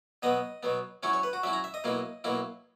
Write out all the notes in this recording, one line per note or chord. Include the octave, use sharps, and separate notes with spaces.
B2 F#3 B3 D#5
B2 F#3 B3
F#3 C#4 E4 C#5
C#5
B4
F#4
F#3 C#4 E4 E5
A#5
E5
D#5
B2 F#3 A#3 E4
B2 F#3 A#3 E4